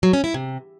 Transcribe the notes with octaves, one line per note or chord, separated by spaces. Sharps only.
F#3
C#4
E4
C3